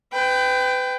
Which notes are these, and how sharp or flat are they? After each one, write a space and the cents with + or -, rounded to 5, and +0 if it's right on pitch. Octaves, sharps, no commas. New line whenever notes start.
B4 +35 G5 +0